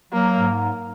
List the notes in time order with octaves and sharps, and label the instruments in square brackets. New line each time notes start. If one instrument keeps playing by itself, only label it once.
[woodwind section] F#3 [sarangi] A#3
[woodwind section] G#2